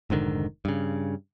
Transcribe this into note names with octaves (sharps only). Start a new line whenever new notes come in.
F1 G#2 D3 D#3
G2 C#3